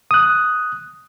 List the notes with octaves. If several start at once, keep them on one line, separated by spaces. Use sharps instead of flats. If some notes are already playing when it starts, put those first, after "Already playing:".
D#6 F#6